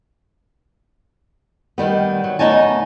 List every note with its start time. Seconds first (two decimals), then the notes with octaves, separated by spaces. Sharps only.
1.78 D#3 G3 B3
2.24 F#3
2.39 D2 B3 D#4 C#5 G#5 A5